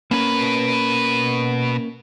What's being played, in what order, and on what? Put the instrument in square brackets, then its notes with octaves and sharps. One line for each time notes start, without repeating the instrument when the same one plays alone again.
[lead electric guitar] B2 B4 [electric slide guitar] A#3 C#4 A#4